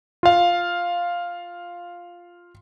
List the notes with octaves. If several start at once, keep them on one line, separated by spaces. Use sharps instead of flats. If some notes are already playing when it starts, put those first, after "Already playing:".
F4 F5